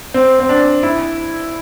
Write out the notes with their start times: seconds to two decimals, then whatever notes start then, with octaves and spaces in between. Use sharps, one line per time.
0.14 C4
0.40 C4
0.49 D4
0.83 E4